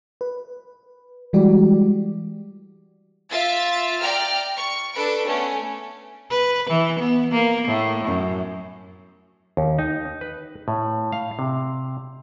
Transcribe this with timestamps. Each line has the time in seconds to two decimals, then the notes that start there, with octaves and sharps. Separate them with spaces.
0.21 B4
1.33 E3 G3 G#3 F#4 G4 D5
3.31 F4 E5 A6
4.01 D5 G5 A#5 F6
4.55 C#6
4.94 D4 A4 B4 D7
5.27 A3 B3 C#4
6.30 B4
6.70 E3
6.99 B3
7.31 A#3
7.67 A2
8.07 F#2
9.57 D#2
9.79 D#4
10.21 B4
10.68 A2
11.12 F5
11.39 C3